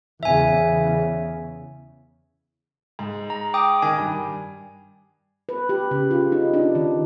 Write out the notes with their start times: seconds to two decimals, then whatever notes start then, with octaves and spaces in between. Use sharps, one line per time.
0.23 E2 C#3 E5 G#5
2.99 G#2
3.30 A#5
3.54 G5 D6 D#6
3.82 D#3 G#5
3.98 G2
5.49 B4
5.69 G4
5.91 C#3
6.11 F4
6.32 D#4
6.54 D4
6.75 D#3